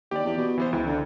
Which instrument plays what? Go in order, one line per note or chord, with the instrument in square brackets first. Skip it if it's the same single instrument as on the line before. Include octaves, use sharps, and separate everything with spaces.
[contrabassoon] D#2 [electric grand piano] G4 D5
[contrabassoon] E2
B2
[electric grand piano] E3 B3 C5
[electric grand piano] C#2 [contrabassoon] E3
[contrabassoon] D3